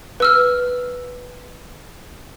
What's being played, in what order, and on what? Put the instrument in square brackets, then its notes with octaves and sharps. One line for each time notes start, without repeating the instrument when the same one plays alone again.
[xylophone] B4 E6 F6